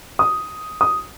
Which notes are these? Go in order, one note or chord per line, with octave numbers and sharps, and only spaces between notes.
D#6
D#6